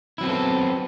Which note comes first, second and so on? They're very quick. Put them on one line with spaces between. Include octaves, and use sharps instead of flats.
E4 F#3 C4 B3 A4